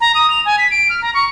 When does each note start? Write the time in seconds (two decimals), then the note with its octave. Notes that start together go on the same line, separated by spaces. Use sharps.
0.01 A#5
0.15 D#6
0.30 F7
0.45 G#5
0.58 B6
0.71 D7
0.90 F6
1.02 A#5
1.14 C#6